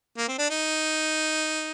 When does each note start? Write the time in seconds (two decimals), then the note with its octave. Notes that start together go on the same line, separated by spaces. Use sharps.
0.18 A#3
0.28 C4
0.38 D4
0.50 D#4